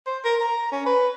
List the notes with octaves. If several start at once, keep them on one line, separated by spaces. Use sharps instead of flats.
C5
A#4
A#5
C#4
B4